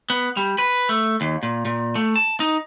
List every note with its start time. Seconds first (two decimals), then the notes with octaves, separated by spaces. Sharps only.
0.10 B3
0.37 G3
0.58 B4
0.89 A3
1.21 D#2
1.43 A#2
1.65 A#2
1.95 A3
2.16 A5
2.40 D#4